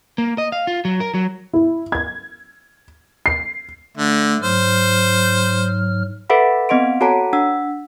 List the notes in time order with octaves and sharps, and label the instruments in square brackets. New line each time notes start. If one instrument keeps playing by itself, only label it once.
[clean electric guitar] A#3
D#5
F5
F4
F#3
A#4
F#3
[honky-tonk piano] E4
G#6
C7
[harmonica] D3 [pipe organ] A3
[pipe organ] G#2 F#3 F6 [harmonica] C5
[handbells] A4 B4 E5 F#5 B5
B3 C4 D#5 F#5 C6 D7
F#4 A4 C#5 F#5 A5 A#5
D4 F#5 E6